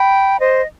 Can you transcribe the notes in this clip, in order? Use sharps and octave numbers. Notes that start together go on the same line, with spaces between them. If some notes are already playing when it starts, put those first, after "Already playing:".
Already playing: G5 B5
C5 D#5